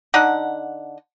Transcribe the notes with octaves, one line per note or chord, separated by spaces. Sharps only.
D3 D#4 F#5